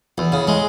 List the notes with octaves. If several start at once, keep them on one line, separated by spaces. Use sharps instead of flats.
E2
C#3
G#3